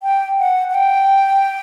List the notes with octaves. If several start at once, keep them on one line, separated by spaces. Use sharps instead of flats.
G5
F#5
F#5
G5